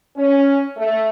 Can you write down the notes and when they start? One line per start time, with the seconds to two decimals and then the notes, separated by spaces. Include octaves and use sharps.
0.17 C#4
0.76 A3